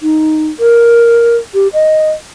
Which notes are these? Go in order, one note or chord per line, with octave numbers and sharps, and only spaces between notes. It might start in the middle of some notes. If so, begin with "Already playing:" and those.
D#4
A#4
G4
D#5